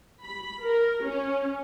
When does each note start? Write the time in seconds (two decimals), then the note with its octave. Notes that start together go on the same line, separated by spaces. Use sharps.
0.25 B5
0.65 A#4
1.04 C#4